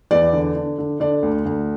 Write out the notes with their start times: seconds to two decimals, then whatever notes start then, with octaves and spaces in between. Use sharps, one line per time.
0.11 E2 D5
0.33 D3
0.55 D3
0.78 D3
1.00 D3 D5
1.23 D2
1.45 D2